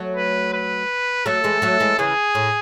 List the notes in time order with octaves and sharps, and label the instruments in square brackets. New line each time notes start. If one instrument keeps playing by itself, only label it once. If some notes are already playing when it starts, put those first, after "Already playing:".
Already playing: [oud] F#3 A3
[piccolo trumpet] B4
B4
[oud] F#3 A3 [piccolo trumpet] A4
[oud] E3 G#3
F#3 A3
E3 G#3
[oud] C#3 E3 [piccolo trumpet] G#4
[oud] A2